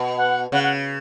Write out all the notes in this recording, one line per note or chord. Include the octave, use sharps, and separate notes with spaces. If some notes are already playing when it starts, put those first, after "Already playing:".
Already playing: B2
F#5
C#3 F#5
F#5